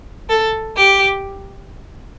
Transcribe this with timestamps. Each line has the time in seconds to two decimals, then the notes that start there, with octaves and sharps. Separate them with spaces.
0.29 A4
0.74 G4